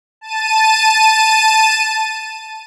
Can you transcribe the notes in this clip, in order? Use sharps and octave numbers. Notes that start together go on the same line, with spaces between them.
A5 D#7